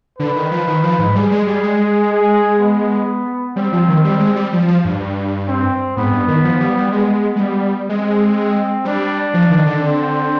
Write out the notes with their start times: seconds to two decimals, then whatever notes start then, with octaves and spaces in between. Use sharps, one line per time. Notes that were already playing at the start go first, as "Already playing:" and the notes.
0.19 D3 B4
0.36 D#3
0.51 F3
0.67 D#3
0.83 F3
0.99 G#2
1.15 G3 G#4
1.31 G#3
1.47 G3
1.63 G#3
2.11 G#4
2.60 B3
3.56 G3 C4
3.72 F3
3.88 D#3
4.04 G3
4.20 G#3
4.36 G3
4.53 F3
4.68 F3
4.85 G2
5.49 C4
5.97 G#2 B3
6.12 G2
6.28 D#3
6.44 F3
6.60 G3
6.77 G3
6.92 G#3 B3
7.36 G#3
7.40 G3
7.88 G#3 C4
8.85 G3 D4
9.34 F3
9.50 D#3
9.66 D3
9.82 C4